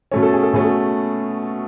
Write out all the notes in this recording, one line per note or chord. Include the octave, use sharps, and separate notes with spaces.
B2 A3 C#4
A4
G#4
A4
B2 A3 C#4 G#4
A4